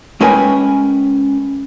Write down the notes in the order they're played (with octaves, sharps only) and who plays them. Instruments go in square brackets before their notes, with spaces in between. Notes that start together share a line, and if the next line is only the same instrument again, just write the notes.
[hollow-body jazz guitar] G#3 C#4 A#4 B4 G5 G#5